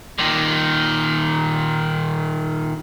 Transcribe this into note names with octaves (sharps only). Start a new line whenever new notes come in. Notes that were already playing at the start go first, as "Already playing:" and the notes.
A#2 D#3